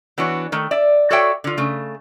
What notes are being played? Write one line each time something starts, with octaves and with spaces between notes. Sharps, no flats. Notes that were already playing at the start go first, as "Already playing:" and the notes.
E3 B3 D4 F#4 C#5
D#3 A3
D5 E5
F#4 A4 C#5 D5 E5 G5
D3 F4
C#3 A3